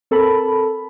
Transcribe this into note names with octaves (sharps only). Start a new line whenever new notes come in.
C4 A4 A#4 A5 B5